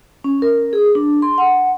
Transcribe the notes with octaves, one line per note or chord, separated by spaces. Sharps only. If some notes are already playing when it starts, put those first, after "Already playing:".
C#4
A#4
G#4
D4
C6
F#5